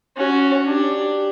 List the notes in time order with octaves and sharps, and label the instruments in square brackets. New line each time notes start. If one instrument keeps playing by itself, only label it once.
[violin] C#4 [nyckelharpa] F#4
[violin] D4 [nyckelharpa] G4